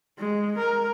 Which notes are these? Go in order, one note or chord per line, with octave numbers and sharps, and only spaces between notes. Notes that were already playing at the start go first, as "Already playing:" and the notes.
G#3
A#4